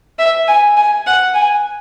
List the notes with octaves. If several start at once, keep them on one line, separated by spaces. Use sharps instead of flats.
E5
G#5
G#5
F#5
G#5